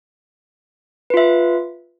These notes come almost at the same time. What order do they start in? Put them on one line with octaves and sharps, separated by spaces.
B4 F4 E5